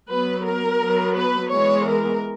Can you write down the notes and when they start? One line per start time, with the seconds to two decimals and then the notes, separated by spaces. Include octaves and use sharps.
0.10 F#3 B3 B4
0.45 A#4
0.81 F#3 B3
1.16 B4
1.52 E3 G#3 B3 C#5
1.87 A#4